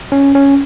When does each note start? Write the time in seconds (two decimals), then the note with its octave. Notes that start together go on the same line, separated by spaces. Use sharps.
0.12 C#4
0.35 C#4